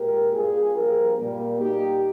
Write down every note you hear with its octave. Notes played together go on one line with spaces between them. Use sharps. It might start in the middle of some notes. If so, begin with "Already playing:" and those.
Already playing: A#2 G#3 G4 A#4
G2 G3 A#3 F4 G#4
G2 F3 A#3 G4 A#4
A#2 G3 A#3
A#2 G3 A#3 D#4 G4